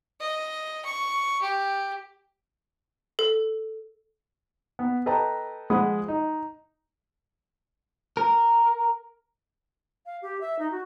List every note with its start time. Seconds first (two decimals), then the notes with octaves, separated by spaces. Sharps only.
0.20 D#5
0.85 C#6
1.42 G4
3.19 A4
4.79 B3
5.06 A4 B4 D#5 G5 A5 A#5
5.70 F3 G#3 F#5 B5 D#6
6.08 D#4
8.17 A#4
10.06 F5
10.22 G4
10.41 E5
10.59 D#4
10.72 F#4